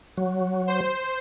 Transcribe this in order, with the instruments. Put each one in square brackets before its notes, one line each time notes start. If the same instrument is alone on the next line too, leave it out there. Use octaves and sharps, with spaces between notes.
[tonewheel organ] F#3
[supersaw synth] C5